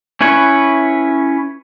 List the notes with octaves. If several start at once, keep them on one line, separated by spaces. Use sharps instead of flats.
C#4 E4 B4 C#5